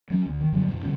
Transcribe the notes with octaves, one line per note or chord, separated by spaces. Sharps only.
F#3 C#4
D2
D#3
F#2 D3 F#3 G3
F2 A#2
C#3 E3 G3 C#4